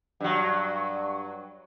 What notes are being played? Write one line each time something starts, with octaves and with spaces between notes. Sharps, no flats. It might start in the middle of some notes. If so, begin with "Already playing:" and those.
G2 F#3